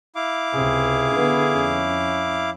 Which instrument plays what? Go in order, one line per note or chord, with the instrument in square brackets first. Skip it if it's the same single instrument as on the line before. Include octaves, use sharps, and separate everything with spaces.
[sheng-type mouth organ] E4 F5 D6
[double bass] C#2 C3 [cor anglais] G#4
[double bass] D3 B3
F2 C#4